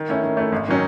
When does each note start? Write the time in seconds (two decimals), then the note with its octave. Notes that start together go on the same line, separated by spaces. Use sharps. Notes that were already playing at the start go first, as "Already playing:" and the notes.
Already playing: D#3
0.09 A3 C#4 E4
0.23 D#3
0.37 A3 C#4 E4
0.52 G#1
0.68 D#3 F#3 C#4